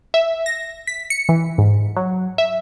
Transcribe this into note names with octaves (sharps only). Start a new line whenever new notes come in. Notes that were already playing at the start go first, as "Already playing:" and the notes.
E5
A#6
B6
C#7
E3
G#2
F#3
E5